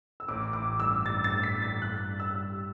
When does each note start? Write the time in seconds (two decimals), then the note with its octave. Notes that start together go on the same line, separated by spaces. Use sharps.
0.20 E6
0.28 A1 D6
0.53 A1 D6
0.79 G2 E6
1.05 G2 A6
1.24 A6
1.31 A1
1.43 B6
1.57 G2
1.62 A6
1.81 G2 F#6
2.08 G2
2.20 E6
2.33 G3